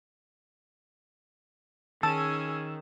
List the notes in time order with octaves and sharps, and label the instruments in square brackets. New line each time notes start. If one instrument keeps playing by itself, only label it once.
[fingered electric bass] D#3 [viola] C#4 G#4 [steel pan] A5 [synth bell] E6 E7